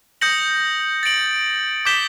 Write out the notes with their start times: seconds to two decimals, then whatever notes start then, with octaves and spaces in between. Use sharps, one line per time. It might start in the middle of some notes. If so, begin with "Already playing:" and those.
0.21 D#6 G6 A#6 C#7 F#7
1.03 A6 D7 F#7
1.85 D6 G6 B6 E7 G7